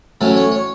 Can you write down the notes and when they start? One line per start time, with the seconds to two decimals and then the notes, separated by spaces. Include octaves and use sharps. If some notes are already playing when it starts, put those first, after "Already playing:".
0.21 A2 F#3 A3 C#4 A4
0.36 C#5
0.51 C#5